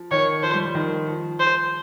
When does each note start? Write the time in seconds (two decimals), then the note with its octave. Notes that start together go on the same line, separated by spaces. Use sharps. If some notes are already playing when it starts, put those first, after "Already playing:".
Already playing: F3
0.11 D#3 C#5
0.43 F3 C5
0.53 G3
0.65 F3
0.75 D#3
1.08 F3
1.40 C5